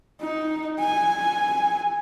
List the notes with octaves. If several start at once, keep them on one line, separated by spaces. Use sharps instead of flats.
D#4
G#5